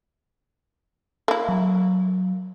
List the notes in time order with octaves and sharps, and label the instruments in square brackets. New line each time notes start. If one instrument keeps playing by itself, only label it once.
[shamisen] A#3 E4
[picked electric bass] F#3